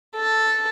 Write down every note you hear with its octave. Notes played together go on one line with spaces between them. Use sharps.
A4